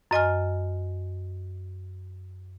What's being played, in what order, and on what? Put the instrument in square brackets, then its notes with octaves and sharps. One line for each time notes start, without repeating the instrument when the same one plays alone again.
[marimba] F#2 D#5 G#5 F6